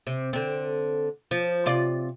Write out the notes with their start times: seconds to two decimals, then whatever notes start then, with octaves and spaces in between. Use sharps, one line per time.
0.07 C3
0.33 D3 C4
1.31 F3
1.66 C3 F4 D5